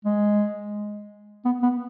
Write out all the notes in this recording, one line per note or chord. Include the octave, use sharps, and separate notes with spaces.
G#3
B3
B3